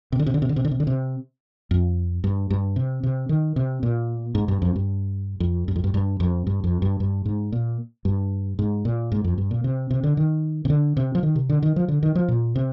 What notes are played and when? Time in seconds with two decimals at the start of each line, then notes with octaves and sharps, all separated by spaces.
0.12 C3
0.19 D3
0.26 C3
0.34 D3
0.42 C3
0.49 D3
0.56 C3
0.65 D3
0.71 C3
0.80 D3
0.87 C3
1.71 F2
2.24 G2
2.50 G2
2.76 C3
3.03 C3
3.29 D#3
3.56 C3
3.83 A#2
4.35 G#2
4.48 G2
4.62 F2
4.76 G2
5.40 F2
5.68 G2
5.76 F2
5.84 G2
5.94 G2
6.20 F2
6.47 G2
6.64 F2
6.82 G2
7.00 G2
7.26 G#2
7.52 A#2
8.05 G2
8.59 G#2
8.85 A#2
9.12 G#2
9.24 F2
9.38 G2
9.51 A#2
9.64 C3
9.91 C3
10.04 D3
10.17 D#3
10.65 C3
10.70 D3
10.97 C3
11.15 F3
11.23 D#3
11.35 C3
11.49 D3
11.62 D#3
11.76 F3
11.88 D3
12.03 D#3
12.15 F3
12.28 A#2
12.56 C3